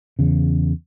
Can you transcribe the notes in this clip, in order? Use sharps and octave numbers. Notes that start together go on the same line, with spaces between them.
E2 C#3